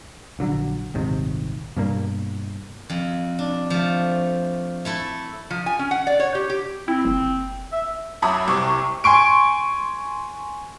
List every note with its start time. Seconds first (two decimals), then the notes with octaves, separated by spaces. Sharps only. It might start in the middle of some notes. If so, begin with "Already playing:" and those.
0.39 A#1 D3 F#3
0.94 D#1 G#1 C3 D#3
1.76 G2 B2 G3 A#3
2.90 F2
3.39 D4
3.70 F3 A3
4.85 A3 E4 A4
5.50 F3
5.66 G#5
5.79 C#4
5.91 F#5
6.07 D5
6.20 C#5
6.35 G4
6.50 G4
6.88 C4 E4
7.05 F#1
7.72 E5
8.22 F#2 F#3 E5 B5 D6 D#6
8.48 C2 C3 C#6 D6 G#6
9.04 G#5 C6 C#6 D7